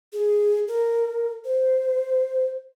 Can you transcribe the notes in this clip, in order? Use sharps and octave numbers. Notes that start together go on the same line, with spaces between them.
G#4
A#4
C5